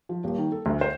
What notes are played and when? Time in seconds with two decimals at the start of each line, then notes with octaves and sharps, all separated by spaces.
0.09 F3
0.24 D#1
0.38 D#3
0.52 A4
0.66 D2
0.81 C5